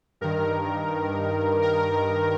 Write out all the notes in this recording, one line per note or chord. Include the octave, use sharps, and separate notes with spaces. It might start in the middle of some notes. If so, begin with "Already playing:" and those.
G2 D#3 A#4
A#4